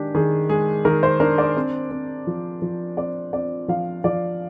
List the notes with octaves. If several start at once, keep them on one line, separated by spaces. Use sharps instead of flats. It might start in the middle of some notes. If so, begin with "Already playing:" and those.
Already playing: D#3 G#3 D4 G4
D#3 G#4
G#3 G#4
D#3 A#4
C5
D4 A#4
D5
C4
C4
F3
F3
C4 D5
C4 D5
F3 F5
F3 D5